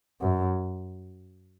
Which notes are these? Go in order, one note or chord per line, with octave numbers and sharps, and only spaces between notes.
F#2